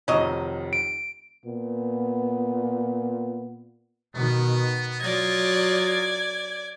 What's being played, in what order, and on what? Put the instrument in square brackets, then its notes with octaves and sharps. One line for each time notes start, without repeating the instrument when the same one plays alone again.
[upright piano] F1 F2 D#3 [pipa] F#3 D#5
[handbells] D7
[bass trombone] A#2 [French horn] B3
[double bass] B2 D#3 [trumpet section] B3
[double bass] F#3 [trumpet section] F4 D#5 [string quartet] D5 G#6